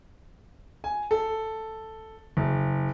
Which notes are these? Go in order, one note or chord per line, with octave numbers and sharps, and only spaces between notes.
G#5
A4
F#1